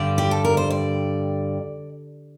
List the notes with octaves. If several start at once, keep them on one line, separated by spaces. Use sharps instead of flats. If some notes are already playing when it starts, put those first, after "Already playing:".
Already playing: G2 D3 G3 D5
G4
A4
A#4
C5
D5